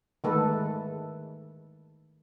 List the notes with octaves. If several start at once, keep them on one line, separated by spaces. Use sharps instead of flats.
D#3 G#3 A3 A4 B4